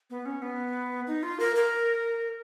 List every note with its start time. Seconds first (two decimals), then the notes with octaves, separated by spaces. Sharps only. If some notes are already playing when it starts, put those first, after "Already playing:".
0.10 B3
0.26 C#4
0.42 B3
1.07 D#4
1.23 F4
1.40 A#4
1.56 A#4